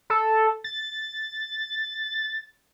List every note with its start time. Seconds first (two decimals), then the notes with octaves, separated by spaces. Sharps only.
0.10 A4
0.64 A6